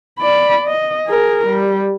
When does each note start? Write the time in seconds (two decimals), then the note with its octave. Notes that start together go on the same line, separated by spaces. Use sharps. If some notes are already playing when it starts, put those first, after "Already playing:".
0.19 D5 B5
0.67 D#5
1.07 G#4 A#4
1.47 G3